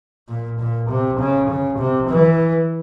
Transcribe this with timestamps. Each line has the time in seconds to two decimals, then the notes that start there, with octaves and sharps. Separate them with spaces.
0.28 A#2
0.60 A#2
0.90 C3
1.20 C#3
1.49 C#3
1.79 C3
2.10 E3